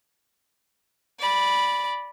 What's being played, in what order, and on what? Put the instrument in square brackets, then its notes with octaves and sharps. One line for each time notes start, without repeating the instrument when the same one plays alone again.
[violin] D5 B5